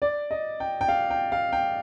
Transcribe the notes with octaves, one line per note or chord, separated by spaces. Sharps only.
D5
D#5
G5
G5
F5
G5
F5
G5